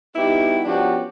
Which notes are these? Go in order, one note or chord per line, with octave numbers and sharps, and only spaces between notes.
G3 B3 D#4 E4 F#4 G4
F3 B3 C#4 D4 F#4 G4